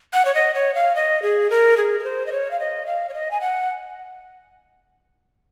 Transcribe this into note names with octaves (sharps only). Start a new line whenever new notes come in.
F#5
C#5
D#5
C#5
F5
D#5
G#4
A#4
G#4
A#4
C5
D#5
C#5
F5
D#5
F5
C#5
D#5
G#5
F#5